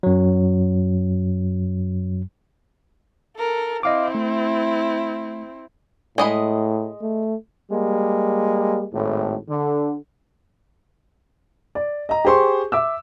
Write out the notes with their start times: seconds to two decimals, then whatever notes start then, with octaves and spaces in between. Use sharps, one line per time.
0.03 F#2 F#3
3.37 A4 A#4
3.83 C4 E4 D#5 F5 D6
4.15 A3
6.18 A2 G#3 D#5 B5
7.02 A3
7.71 G3 G#3 A#3
8.94 G#1 A2
9.49 D3
11.75 D5
12.09 D#5 A#5
12.25 G4 G#4 C5 C6 C#6
12.72 E5 D6 E6